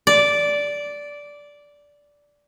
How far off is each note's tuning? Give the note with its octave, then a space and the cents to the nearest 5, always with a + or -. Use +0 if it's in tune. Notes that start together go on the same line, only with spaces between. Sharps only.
D5 -10